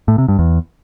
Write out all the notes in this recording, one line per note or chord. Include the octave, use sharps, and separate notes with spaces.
A2
C3
G2
E2